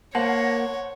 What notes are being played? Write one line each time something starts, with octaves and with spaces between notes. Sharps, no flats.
A#3 C5 C#5 F#5 A5